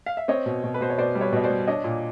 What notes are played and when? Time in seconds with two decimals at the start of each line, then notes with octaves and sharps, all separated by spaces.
0.06 F5
0.17 E5
0.28 C4 C#5 D#5
0.46 B2
0.64 B2
0.74 B4
0.81 B2 C5
0.90 C#5
0.98 B2 C5 D5
1.15 G3
1.21 B4 C#5
1.33 B2 D#5
1.44 C5 D5
1.50 G3
1.67 D4 C#5 D#5
1.84 A#2